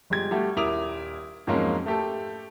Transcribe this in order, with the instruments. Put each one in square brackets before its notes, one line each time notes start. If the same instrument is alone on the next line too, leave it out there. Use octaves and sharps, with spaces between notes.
[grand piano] G1 G#3 G4 G#6
G3 A3 F#4 G4
D#1 E4 A#4 D6 D#6 F7
F2 G#2 F#3 G#3 A#3 C#4
A3 G4 A4